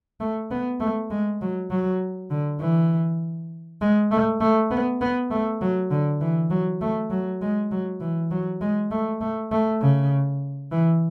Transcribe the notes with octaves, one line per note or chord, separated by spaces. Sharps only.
A3
B3
A3
G#3
F#3
F#3
D3
E3
G#3
A3
A3
B3
B3
A3
F#3
D3
E3
F#3
A3
F#3
G#3
F#3
E3
F#3
G#3
A3
A3
A3
C#3
E3